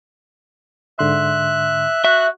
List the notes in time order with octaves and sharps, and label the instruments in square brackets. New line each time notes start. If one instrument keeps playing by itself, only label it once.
[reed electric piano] G#2 D3 C6 [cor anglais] E5 [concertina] F#6
[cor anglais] F#4 [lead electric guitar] E5